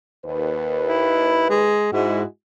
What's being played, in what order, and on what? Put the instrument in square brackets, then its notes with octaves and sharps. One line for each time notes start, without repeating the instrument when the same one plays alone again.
[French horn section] D#2 B4
[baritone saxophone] E4
G#3
[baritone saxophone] G#2 [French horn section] G#3 E4 F#4